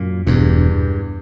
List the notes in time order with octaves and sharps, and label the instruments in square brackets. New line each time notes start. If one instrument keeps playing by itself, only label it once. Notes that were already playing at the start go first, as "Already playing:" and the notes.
Already playing: [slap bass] F#2 A#2
[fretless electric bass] E1 [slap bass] E2 G2